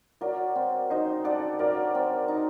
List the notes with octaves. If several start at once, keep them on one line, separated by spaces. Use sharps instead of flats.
F#3 A#4 D5
C4
D#4 C5 D#5
A4 D5 F#5
F#3 A#4 D5
C4
D#4